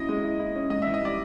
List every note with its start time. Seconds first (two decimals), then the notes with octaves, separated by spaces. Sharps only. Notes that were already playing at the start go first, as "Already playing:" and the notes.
Already playing: F#3 C#4 E4 D#5
0.09 G#3
0.23 E4
0.39 E4
0.55 C#4
0.70 G#2 D#5
0.82 E5
0.86 E3
0.94 D#5
1.02 G3 D5